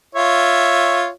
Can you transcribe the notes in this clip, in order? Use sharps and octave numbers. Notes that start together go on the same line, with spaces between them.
F4 C#5 E5